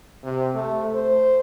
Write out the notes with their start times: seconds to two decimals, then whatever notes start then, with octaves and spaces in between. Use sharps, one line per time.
0.24 C3
0.55 A3
0.95 C5